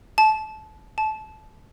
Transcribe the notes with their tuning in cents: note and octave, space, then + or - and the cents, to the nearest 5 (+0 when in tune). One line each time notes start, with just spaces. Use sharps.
A5 -25
A5 -25